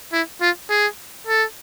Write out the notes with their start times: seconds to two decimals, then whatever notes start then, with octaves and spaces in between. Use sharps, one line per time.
0.13 E4
0.41 F4
0.70 G#4
1.27 A4